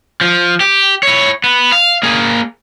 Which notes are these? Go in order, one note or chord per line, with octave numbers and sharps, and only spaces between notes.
F3
G4
E4 C#5
B3
F5
A#3 G#4